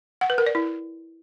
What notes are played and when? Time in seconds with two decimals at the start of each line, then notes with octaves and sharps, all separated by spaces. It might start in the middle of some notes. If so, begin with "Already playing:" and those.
0.21 F#5
0.30 B4
0.38 A#4
0.46 D5
0.55 E4